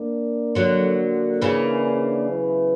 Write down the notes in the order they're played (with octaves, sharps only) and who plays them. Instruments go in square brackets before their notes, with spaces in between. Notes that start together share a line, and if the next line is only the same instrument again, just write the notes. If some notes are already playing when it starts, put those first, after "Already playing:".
Already playing: [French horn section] A#3 D4 A#4
[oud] D3 F#3
C#3 E3
[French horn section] F#3 B3 E4 B4